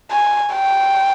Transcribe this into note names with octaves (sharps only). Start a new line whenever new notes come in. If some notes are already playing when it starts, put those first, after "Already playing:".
G#5
G5